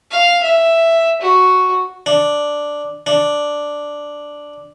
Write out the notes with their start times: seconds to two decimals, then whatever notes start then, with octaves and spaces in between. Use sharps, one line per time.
0.11 F5
0.43 E5
1.21 F#4
2.06 D4
3.07 D4